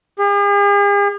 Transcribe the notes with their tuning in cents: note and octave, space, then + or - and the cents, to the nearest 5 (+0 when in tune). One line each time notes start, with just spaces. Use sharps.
G#4 -45